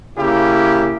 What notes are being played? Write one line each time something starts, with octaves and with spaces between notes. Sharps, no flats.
C#3 A#3 E4 G4